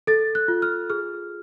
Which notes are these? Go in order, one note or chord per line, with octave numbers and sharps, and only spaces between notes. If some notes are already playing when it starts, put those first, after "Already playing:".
A4 A6
F#6
F4
F6
G#4 F6